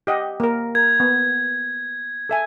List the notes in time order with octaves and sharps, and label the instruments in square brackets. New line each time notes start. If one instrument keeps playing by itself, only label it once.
[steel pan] G4 D#5 F#5
A#3 A#4
[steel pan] A#4 [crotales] G#6
[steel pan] B3
A4 E5 G#5